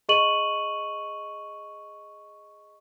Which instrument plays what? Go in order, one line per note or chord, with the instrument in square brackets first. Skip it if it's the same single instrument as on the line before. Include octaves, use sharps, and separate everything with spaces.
[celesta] G#4 D#5 C#6 D#7 F#7